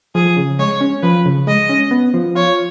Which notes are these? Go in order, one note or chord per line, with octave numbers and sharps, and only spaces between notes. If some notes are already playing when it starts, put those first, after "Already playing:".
F3 G#4
C#3
G#3 C#5
C#4
F3 B4
C#3
G#3 D#5
C#4
B3
F3
F4 C#5